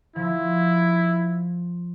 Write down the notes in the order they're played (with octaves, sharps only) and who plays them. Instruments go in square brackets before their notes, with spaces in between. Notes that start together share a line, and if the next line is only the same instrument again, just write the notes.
[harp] F3 [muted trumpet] E4